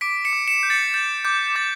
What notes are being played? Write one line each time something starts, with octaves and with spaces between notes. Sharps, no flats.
D6 B6 D7
C#7 E7
D6
C#7 E7
G6
A6 C#7
G6 A6
D6 G6
D6 A6